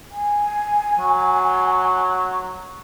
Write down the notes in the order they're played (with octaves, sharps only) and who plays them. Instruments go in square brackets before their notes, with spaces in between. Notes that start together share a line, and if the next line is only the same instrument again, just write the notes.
[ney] G#5
[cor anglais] F#3